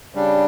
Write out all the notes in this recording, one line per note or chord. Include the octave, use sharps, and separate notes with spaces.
C#3 G3 D4